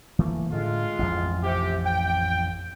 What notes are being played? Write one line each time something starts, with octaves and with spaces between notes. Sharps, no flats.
E3 A3 A#3
A2 D3 G#3 F4
A1 F2
C3 G4
G5